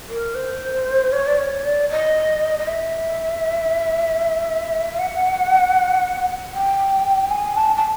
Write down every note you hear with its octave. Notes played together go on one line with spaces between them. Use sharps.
A#4
C5
C#5
D5
C#5
D5
D#5
D#5
E5
F5
F#5
G5
G#5
A5
A5